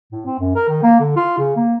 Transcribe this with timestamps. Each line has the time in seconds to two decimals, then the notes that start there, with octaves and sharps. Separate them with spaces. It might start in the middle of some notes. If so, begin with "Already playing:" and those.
0.12 A2
0.26 C4
0.39 F#2
0.55 A#4
0.69 D#3
0.83 A#3
1.00 D3
1.16 F4
1.38 C#3
1.56 A#3